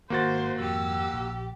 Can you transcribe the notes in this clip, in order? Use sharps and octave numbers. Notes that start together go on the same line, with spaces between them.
G#1 G#2 D#3 A#3 F#4 C5 A6
F2 G#2 D#3 G4 E6
A#1